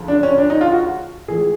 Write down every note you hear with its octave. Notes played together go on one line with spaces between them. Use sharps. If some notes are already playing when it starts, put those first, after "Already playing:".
Already playing: D2 C#3 F3
D4
C#4
D4
D#4
F4
F#4
A2 E3 G#3 G#4